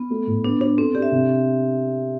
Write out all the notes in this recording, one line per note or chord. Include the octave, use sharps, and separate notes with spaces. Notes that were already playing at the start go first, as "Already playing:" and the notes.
Already playing: B3
A3
A2
B3 D4
D4 C5
C4 A4
D4 G4
E5
C3